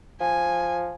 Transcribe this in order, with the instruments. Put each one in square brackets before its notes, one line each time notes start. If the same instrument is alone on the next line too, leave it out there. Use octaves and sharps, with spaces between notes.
[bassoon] F3 [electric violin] G#5